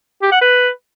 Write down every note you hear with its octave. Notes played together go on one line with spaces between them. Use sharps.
G4
F#5
B4